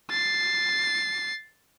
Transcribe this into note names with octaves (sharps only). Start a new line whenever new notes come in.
A6 C7